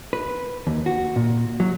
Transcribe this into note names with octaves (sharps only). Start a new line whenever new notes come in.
B4
D#2
F#4
A#2
F#3